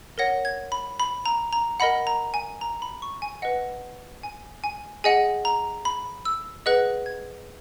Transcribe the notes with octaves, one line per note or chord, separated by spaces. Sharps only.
A#4 C#5 F#5 A#6
G#6
B5
B5
A#5
A#5
A#4 D#5 F#5 B5
A#5
G#5
A#5
B5
C#6
G#5
B4 D#5 F#5
G#5
G#5
G#4 D#5 F#5 G#5
A#5
B5
E6
G#4 B4 D#5 F#5 F#6
G#6